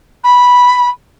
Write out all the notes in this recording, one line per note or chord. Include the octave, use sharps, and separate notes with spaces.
B5